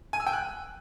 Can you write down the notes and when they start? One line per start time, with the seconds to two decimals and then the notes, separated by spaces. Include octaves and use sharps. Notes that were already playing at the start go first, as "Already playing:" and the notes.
0.13 G#5
0.20 E6
0.27 G5
0.33 F#6